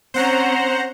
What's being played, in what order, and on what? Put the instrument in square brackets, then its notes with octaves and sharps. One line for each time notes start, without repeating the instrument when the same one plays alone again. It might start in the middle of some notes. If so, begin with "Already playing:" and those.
[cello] C4 C#4 [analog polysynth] C5 F#5 A#5